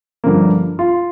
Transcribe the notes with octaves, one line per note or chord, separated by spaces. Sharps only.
G2 D3 F3 A#3
F4